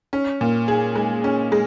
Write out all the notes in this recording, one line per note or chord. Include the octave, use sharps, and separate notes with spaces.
C#4
A#2
G#4
G#3
C#4
G#3